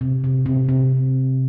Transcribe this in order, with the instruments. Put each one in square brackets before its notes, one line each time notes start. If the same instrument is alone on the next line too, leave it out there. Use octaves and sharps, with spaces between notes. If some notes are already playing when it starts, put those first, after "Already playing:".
[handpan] C3
C3
C3
C3